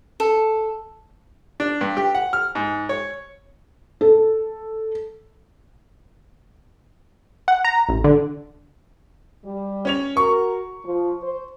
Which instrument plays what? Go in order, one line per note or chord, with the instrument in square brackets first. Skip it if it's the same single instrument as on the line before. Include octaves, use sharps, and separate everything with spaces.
[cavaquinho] A4
[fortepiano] D4
G2
G4
F#5
F6
G#2
C#5
[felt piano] A4
[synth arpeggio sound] F#5
A#5
A1
D3
[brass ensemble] G3
[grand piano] C#4 C#5 F7
[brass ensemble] F#4 A#4 [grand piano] C#6
[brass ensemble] F3
C5